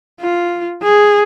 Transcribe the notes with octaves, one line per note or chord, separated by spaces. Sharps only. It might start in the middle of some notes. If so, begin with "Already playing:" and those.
F4
G#4